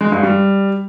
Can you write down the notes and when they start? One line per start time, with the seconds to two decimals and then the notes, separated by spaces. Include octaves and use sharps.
0.01 G#3
0.12 G2
0.23 G3